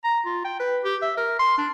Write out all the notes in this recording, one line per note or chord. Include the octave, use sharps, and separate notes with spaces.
A#5
F4
G5
B4
G4
E5
A#4
C6
D4